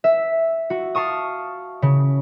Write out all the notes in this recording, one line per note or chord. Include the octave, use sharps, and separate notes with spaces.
E5
F#4
F5 A5 C#6 D#6
C#3